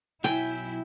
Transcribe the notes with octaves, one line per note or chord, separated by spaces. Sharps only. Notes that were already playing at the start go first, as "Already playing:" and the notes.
B1 F#3 E4 G5 G#5